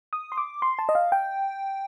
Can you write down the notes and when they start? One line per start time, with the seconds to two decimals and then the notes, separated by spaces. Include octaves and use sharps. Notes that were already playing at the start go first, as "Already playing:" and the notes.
0.13 D#6
0.32 C6
0.38 D6
0.62 C6
0.79 A5
0.89 D#5
0.95 F5
1.12 G5